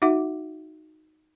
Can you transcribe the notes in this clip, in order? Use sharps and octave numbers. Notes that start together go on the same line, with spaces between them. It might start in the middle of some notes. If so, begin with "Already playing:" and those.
D#4 F#4 E5 F#5 D6